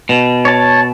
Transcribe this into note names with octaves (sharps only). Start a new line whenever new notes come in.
B2
C#5 A5